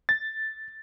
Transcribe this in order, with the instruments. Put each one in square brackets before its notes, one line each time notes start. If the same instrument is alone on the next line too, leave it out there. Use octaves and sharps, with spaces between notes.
[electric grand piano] A6